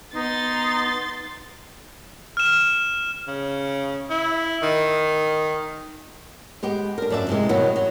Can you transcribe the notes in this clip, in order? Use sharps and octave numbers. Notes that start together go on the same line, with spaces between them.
B3 D#4 C6 A6
F6 E7
C#3
E4
D#3
G#3 B3 G4
D4 A#4
F#2 D5 E5
C3 E3 G#3
B2 D#3 F#3 G3 B3 E4
F#3